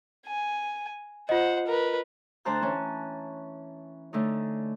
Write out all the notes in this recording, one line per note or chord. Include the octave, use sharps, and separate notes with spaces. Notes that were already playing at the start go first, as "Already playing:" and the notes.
G#5
F4 C5 D#5 F#5
A#4 B4
D2 D4 C5 A5 A#5 F#6
E3 C#4
D3 A3 C#4 D#4